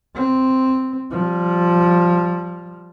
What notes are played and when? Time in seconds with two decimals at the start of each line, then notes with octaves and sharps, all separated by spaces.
0.15 C4
1.11 F3 G3